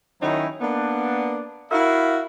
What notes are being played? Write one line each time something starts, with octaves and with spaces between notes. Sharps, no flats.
D#3 F#3 C#4 D#4 E4
A#3 B3 D4
E4 F#4 A#4 E5 F5